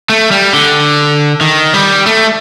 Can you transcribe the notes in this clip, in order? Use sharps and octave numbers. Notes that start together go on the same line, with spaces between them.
A3
G3
D3
D#3
G3
A3